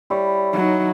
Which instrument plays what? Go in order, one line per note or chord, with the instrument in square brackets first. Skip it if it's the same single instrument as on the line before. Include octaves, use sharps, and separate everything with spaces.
[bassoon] G3 [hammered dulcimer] E4 C#5
[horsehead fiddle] F#3 D#4